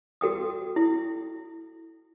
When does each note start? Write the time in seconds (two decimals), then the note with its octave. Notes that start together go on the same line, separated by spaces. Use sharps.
0.21 F#4 A4 G5 D#6
0.76 E4